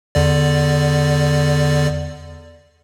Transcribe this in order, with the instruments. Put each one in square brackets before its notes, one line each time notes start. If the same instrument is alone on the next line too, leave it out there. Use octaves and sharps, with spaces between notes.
[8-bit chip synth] E2 D3 D5